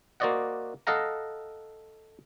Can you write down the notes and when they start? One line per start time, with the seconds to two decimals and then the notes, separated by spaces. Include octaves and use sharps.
0.20 A#3 F#4 C5 D5 D#5 F#5
0.87 A4 D#5 F5 F#5 A#5